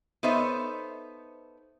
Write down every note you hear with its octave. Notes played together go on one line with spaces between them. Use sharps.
B3 D#4 A4 C5 C#5 E5